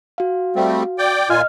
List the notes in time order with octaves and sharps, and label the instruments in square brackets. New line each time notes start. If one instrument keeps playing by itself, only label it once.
[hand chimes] F#4 F5
[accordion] G3 A3 C4
D5 G5
[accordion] A#2 F4 G#5 [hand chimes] D#5 F6